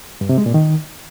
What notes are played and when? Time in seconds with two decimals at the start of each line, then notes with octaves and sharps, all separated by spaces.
0.21 G2
0.29 C3
0.38 G#3
0.46 A#2
0.54 D#3